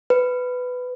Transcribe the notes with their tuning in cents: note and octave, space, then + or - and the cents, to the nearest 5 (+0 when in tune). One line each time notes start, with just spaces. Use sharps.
B4 +15